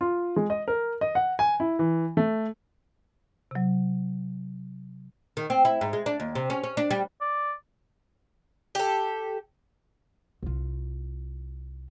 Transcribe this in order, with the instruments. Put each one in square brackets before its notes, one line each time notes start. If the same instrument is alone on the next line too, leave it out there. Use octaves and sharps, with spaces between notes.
[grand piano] F4
G#3
D#5
A#4
D#5
F#5
G#5
E4
E3
A3
[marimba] C3 F#3
[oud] D#3
C4
E4
G#2
G#3
D4
D#2
C3
C#4
C#4
D4
G3
[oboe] D5
[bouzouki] G4 A4
[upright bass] C2 F4